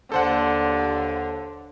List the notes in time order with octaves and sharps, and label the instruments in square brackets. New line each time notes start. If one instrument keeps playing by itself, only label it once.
[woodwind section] D#2 [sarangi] D3 [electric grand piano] A4 C5 F#5